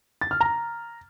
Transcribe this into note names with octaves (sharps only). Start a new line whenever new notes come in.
A6
F6
A#5